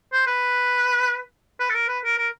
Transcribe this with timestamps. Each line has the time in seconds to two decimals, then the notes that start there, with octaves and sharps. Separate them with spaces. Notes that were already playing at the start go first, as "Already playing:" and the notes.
0.13 C5
0.27 B4
1.60 B4
1.70 A4
1.74 A#4
1.88 B4
2.04 A#4
2.18 A#4